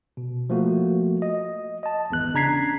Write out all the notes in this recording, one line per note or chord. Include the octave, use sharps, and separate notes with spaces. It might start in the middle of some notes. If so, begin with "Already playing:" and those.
B2
F3 A3 A#3 F#4
D#5
D#5 A5
G#1 E2 F#6
C#3 D4 A#5 G#6 B6 C7